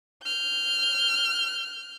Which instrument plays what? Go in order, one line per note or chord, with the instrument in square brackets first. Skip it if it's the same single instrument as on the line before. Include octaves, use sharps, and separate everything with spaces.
[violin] F6 G6